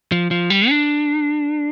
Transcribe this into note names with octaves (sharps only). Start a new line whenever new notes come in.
F3
F3
G3
D4